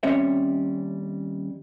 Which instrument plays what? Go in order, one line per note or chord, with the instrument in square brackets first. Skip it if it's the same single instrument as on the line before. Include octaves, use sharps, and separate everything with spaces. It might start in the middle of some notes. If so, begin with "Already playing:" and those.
[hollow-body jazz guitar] D#2 G3 C4 C#4 C#5 E5